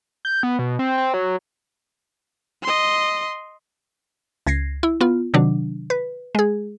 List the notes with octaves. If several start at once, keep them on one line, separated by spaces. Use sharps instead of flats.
G6
B3
B2
C4
C4
F#3
D#5 C6
C#2 G#6 A#6 C7
E4
B3 F4
C3 D#3 F#3 D4
B4
G#3 G#4